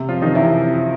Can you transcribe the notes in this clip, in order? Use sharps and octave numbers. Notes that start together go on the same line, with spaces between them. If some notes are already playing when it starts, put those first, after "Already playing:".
Already playing: C3
F3 F4
D#3 D#4
C3 E3 E4